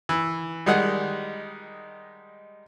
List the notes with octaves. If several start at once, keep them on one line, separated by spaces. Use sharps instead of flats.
E3
D#3 G3 G#3 D#4 F#5